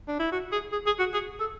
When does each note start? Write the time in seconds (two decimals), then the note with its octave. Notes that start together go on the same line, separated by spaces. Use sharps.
0.08 D4
0.19 E4
0.32 F#4
0.52 G#4
0.72 G#4
0.86 G#4
0.99 F#4
1.14 G#4
1.40 A4